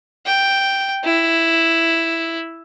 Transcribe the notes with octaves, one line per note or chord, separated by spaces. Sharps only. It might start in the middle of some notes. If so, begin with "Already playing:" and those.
G5
E4